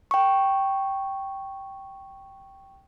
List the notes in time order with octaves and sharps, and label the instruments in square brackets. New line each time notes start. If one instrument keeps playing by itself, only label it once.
[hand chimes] G5 C#6